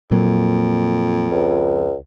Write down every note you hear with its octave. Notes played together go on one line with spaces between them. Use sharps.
F2 A#2 F#3 A#3
C#2